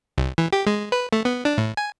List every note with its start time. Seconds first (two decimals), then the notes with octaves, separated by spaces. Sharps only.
0.18 C2
0.38 E3
0.53 G4
0.67 G#3
0.92 B4
1.13 A3
1.25 B3
1.45 D4
1.58 A2
1.77 G#5